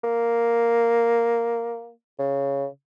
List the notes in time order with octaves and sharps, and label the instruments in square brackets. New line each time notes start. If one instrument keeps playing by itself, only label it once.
[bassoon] A#3
C#3